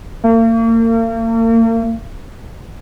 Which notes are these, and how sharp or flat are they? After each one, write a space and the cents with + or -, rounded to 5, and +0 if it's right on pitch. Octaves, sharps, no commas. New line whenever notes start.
A#3 -40